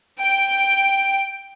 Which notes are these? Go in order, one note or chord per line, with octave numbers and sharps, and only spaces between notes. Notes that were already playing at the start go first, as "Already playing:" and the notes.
G5